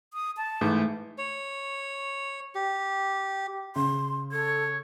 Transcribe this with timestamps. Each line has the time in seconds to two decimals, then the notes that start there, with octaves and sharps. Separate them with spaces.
0.14 D#6
0.37 A5
0.61 G#2 E3 A3
1.18 C#5
2.55 G4
3.76 C#3 C6
4.32 A4 C#5